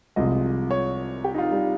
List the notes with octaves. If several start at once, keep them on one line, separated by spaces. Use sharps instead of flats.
C2 C3 F3 G#3 D#5
C#5
G4
D#4
F4
G3